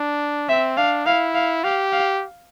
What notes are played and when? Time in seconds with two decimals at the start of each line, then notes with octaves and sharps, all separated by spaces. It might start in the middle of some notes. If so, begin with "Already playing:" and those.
Already playing: D4
0.49 C4 E5
0.77 D4 F5
1.06 E4 F5
1.35 F5
1.64 G4 F5
1.93 F5